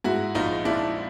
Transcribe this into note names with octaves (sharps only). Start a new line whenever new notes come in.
G#2 E4 F#4
A#1 D#4 F4
A#1 D4 E4